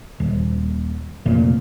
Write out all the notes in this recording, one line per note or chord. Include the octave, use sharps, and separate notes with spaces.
D#1
F1 A#2